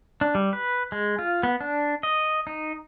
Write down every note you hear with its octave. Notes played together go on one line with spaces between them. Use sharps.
D4
G3
B4
G#3
F4
B3
D4
D#5
D#4